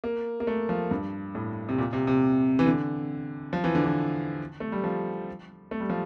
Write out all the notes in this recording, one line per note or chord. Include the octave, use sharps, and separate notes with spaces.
A#3
A#3
A3
F3
G2
A2
C3
A#2
C3
C3
E3
D3
F3
E3
D3
E3
A3
G3
F3
A3
G3
F3